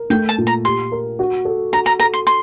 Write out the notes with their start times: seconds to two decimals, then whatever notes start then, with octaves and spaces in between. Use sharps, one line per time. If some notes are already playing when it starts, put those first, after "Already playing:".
Already playing: A#4
0.10 A3 G5
0.29 A5
0.38 A#2
0.47 A#5
0.65 G4 C6
0.92 A#4
1.19 F#4
1.45 A4
1.73 F#4 A#5
1.86 A#5
1.99 A4 A#5
2.14 C6
2.27 C6